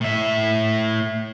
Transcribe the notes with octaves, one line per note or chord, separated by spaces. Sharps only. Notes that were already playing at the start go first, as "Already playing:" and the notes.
A2 E5